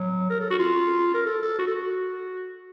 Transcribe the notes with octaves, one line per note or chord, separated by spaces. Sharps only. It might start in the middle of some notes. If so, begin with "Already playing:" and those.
Already playing: F#3
A#4
A4
F#4
F4
A#4
A4
A4
F#4
A4
F#4